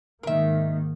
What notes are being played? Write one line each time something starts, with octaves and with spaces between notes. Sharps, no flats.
G#2 D#3 A#3 A#4 E5